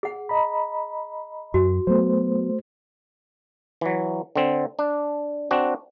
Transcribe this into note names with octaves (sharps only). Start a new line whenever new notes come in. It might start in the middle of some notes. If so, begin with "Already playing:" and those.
G#4 F#5
D#5 A#5 B5
F#2 F#4
F#3 A3 B3 C5
E3 F#3
D3 C4
D4
C4 D4 F#4